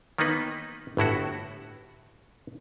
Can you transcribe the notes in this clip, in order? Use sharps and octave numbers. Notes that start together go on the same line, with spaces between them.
D#3 A#3 B3 D#4 B4
G1 A2 E4 F#4